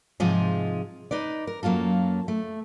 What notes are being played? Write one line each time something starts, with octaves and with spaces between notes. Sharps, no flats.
G#2 C3 F3 G#3 F4 G#4
D#4 B4 D5
A#4
F#2 F#3 A#3 F4 A4
A3